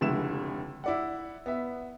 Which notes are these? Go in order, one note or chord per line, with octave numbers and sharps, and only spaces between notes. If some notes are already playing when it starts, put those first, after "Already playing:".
F1 C#2 D3 E4 E7
E4 D5 F#5
B3 E5